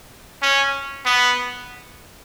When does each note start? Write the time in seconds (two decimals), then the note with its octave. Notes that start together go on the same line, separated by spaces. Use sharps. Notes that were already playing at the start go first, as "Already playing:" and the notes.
0.42 C#4
1.06 B3